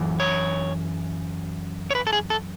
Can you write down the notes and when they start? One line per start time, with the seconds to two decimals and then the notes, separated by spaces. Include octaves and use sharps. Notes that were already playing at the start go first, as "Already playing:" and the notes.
Already playing: F#2 E3
0.20 C#5
1.90 C#5
1.95 B4
2.07 A4
2.13 G#4
2.30 A4